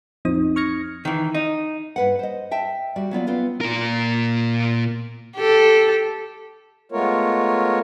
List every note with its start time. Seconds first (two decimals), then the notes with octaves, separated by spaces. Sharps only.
0.25 A1 F2 F3 C4 D#4 D#6
0.56 C#6 F6 G#6 A#6 C#7
1.05 D#3 E3
1.35 D#4
1.96 G2 B4 F#5
2.19 C5 D#5
2.51 E5 G5 A5
2.96 G3 F#4 D5
3.11 F#3 B3 F4 D5
3.27 B3 C4 F4 B4
3.61 A#2 A#4
5.37 G4 A4
6.92 G#3 A3 B3 F4 A#4 C#5